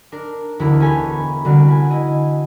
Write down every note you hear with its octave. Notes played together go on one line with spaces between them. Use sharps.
D4 A#4
E1 D2 E4 A#4 A#5 B5
C#4 G4 A4 G#5 A#5 B5
C2 D3 G3 F#4 F5
G#5 B5
E4 D#5